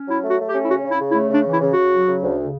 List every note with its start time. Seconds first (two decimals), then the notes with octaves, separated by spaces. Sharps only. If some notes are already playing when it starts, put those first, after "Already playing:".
Already playing: C#4
0.08 F#3 E4
0.23 A3
0.28 F#4
0.39 A3
0.48 G4
0.54 C#4
0.64 E4
0.69 C#3 F#4
0.84 C#3
0.90 E4
1.00 C#3
1.10 E4
1.15 A3
1.30 C#3 D4
1.45 E3
1.51 E4
1.61 C#3
1.72 F#4
1.77 C#3
1.92 F#3
2.07 C#3
2.22 D2
2.38 C#3